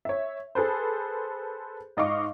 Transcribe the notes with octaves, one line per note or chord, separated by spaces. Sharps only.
C#5 E5
G#4 A4 B4 C5
G#2 D#5 F5 C#6 D6